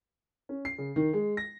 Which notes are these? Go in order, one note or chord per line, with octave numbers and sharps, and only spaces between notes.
C#4
C7
C#3
D#3
G#3
A#6